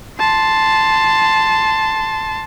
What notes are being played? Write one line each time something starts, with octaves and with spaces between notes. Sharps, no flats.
A5 C6